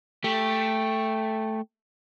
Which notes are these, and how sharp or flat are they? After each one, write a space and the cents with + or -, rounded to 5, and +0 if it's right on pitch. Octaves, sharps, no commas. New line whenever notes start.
A3 +0 G4 +5